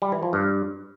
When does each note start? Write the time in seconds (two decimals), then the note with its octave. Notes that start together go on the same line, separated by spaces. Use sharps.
0.02 G3
0.12 E3
0.23 F3
0.33 G2